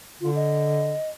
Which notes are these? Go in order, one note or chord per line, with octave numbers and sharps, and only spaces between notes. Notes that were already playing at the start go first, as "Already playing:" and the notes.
D3 F4
D#5